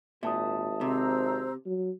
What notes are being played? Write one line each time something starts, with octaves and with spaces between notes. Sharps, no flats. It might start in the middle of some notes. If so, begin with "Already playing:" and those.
G#1 A#2 E5 A5 D#6
C3 C5 A#5 E6
F#3